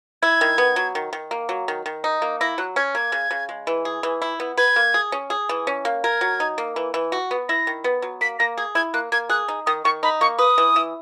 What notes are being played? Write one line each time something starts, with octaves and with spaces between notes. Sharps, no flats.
E4 G#6
D#3
B3
F#3
D#3
D#3
A#3
F#3
D#3
D#3
D#4
A#3
E4 A#6
F#3 F#6
C#4 G#6
A#3 G#6
C#3
C#3
G#3
E3
G#4
E3
E4
B3
B4 G#6
A#3
G#4
C#4
G#4
E3
C#4
A#3
A#4 G#6
F#3
D#4
A#3
E3
E3
F#4
B3
E4 A#6
D#3
B3
F#3
A#3 B6
A#3 A#6
G#4 G#6
E4 G#6
A#3 F#6
A#3 G#6
G#4 F#6
D#4
D#3 D#6
D#3 C#6
D#4 B5
A#3 C#6
B4 D#6
E3
E4